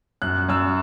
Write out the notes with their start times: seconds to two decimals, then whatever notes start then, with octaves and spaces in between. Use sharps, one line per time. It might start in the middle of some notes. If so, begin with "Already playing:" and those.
0.22 F#2 F#6
0.49 F#2 E6